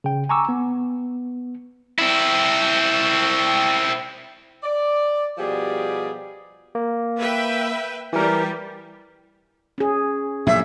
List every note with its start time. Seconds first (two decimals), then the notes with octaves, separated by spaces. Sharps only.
0.04 C#3 G5
0.29 G#5 A#5 C#6 D6 E6
0.49 B3
1.98 C4 E4
4.63 D5
5.37 B2 F3 G3 G4 G#4 D5
6.75 A#3
7.19 B4 E5 G5
8.13 E3 G3 G4 A#4
9.78 C#4 G#4
10.47 A#1 F#2 A2 E5